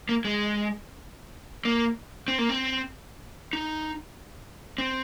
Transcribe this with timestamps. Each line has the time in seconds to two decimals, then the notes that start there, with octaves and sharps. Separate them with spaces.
0.09 A#3
0.25 G#3
1.65 A#3
2.28 C4
2.38 A#3
2.49 C4
3.53 D#4
4.78 C4